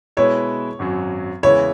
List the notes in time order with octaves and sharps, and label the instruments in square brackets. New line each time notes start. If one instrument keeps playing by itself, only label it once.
[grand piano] B2 G#3 E4 B4 E5 [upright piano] C#5
[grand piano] G#1 F#2 F#3
[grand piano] E2 C#3 G#3 E4 B4 [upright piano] C#5